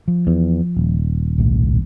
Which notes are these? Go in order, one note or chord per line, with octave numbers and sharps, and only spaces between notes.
F3
E2
D#1
B1 A2